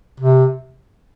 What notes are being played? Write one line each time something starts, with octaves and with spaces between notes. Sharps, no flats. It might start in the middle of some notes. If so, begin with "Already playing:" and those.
C3